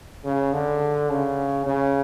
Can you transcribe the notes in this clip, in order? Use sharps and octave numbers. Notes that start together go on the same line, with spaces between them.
C#3
D3
C#3
C#3